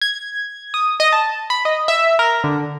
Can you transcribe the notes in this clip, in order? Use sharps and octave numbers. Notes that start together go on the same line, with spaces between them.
G#6
D#6
D#5
A5
B5
D#5
E5
A#4
D3